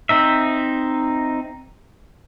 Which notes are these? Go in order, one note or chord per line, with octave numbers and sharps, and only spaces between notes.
C4 D#4 E5